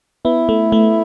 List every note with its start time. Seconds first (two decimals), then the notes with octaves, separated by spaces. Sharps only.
0.25 B3 E4
0.49 A3
0.72 A3